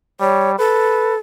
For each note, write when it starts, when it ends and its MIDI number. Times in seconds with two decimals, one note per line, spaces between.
0.21 0.54 55
0.21 0.51 73
0.58 1.18 69
0.58 1.14 71